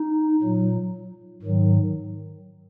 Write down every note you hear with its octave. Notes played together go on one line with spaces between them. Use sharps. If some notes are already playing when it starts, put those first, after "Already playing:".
Already playing: D#4
A#2 F#3
G#2 D#3 F#3